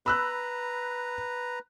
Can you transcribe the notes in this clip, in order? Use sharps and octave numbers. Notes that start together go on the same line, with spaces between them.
B4 A#5 B5 E6 F#6